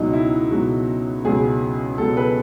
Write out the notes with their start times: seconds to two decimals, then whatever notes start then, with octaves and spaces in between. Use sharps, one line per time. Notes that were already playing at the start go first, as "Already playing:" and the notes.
Already playing: C#2 B2 F#3 D#4
0.13 E4
0.51 C#2 B2 F#3 F#4
1.24 C#2 B2 F#3 G#4
1.98 C#2 B2 F#3 A4
2.17 B4